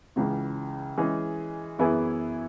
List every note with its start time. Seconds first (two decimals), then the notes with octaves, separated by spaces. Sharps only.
0.16 C#2 C#3 E3
0.97 E3 G#3 C#4 G#4
1.79 F#2 E3 B3 E4 G#4